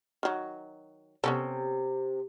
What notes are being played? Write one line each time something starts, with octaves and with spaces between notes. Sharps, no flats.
D#3 F#3
C3 B3 C#4 A4